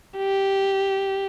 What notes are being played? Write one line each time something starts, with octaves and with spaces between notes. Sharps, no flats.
G4